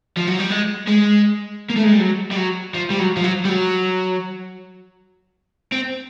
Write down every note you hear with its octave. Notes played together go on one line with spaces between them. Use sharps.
F3
F#3
G3
G#3
G#3
A#3
A3
G#3
G3
F#3
G3
F#3
F3
G3
F#3
F3
F#3
G3
F#3
C4